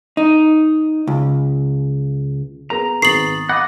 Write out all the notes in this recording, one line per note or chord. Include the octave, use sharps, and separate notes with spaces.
D#4
C#2
B3 G#4 A#5 A#6
G#1 B3 G#4 C#6 D#6 A6 C7 F#7
D#5 F5 F#5 B5 D6 D#6 A#6